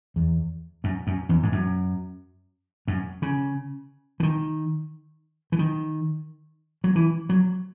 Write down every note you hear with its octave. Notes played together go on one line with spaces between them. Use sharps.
E2
F#2
F#2
E2
G#2
F#2
F#2
C#3
E3
D#3
E3
D#3
F#3
E3
F#3